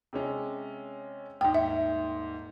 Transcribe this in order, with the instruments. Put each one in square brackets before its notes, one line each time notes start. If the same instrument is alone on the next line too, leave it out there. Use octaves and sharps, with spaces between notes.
[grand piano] C3 G#3 C#4
[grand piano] D#1 G#2 [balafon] G5
[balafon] E5